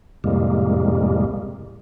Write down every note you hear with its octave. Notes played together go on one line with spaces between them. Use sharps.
F2 A2 C3 G3 G#3 A#3